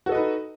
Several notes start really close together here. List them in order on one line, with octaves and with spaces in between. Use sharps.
F#4 A4 D#5 B4 D#4